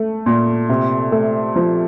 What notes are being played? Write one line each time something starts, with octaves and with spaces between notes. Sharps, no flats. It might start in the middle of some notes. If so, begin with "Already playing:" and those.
Already playing: A3
A#2
C3
A3
F3